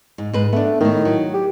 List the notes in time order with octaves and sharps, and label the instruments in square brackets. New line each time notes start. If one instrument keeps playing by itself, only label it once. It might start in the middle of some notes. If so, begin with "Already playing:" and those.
[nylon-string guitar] G#2
G#2 B4
[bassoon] A3 [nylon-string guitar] B3 D4
[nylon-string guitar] A2 A3 [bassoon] D#3
[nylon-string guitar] F#3
[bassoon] G4